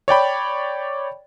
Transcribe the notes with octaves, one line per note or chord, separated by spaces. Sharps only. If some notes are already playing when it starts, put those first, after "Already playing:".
C#5 D5 G5 B5